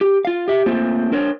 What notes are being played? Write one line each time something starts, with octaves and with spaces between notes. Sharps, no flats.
G4
F4 F5
G4 E5
A3 A#3 C4 F4 C5
D4 A#4 C5 C#5